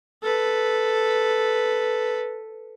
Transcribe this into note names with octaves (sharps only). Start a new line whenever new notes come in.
A4 B4